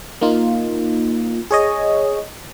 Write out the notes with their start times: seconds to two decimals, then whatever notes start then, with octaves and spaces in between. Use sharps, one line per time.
0.21 A#3 D#4 F4
1.51 G#4 C#5 D#5